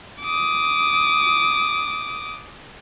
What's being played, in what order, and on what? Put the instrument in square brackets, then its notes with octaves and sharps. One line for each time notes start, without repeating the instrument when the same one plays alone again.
[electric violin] D6 D#6